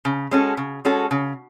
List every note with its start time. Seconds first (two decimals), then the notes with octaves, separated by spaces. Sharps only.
0.05 C#3
0.31 G#3 C#4 F#4 A4
0.57 C#3
0.85 G#3 C#4 F#4 A4
1.11 C#3